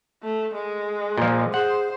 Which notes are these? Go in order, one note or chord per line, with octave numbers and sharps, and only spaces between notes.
A3
G#3
A#2 F3
G#4 C5 F#5